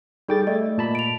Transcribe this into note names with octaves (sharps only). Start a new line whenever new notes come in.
G3 D#4 G#4 A4 G5 A6
A3 D5 D#5
A#2 A5 B5
D7 F7